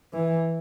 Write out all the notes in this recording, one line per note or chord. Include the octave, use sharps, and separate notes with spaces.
E3